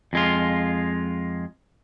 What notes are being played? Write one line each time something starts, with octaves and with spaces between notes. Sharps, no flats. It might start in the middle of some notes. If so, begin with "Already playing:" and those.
F2 G#3 F4